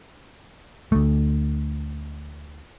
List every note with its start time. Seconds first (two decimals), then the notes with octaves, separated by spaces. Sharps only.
0.92 D2 A3